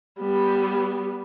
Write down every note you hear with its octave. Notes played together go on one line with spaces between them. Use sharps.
G3 B3